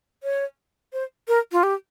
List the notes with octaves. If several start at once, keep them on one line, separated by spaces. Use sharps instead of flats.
C#5
C5
A#4
F4
G4